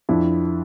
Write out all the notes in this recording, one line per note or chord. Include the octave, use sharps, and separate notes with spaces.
F2 D4 E4